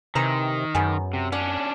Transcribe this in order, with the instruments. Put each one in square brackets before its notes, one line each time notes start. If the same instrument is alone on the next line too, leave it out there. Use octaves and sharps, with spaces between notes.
[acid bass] C3 [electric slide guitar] D#3 [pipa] E3 C5 A#5
[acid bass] F#2 [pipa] B3 C#4 G#4
[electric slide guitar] C3
[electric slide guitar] C#4 D4 [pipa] D5 F#5